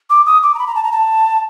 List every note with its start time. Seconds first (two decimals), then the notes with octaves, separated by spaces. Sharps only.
0.09 D6
0.26 D#6
0.42 D6
0.54 A#5
0.58 B5
0.67 A#5
0.75 A5
0.83 A#5
0.92 A5